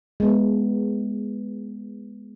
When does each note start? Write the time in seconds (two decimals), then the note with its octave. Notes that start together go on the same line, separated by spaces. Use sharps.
0.20 G#3 B3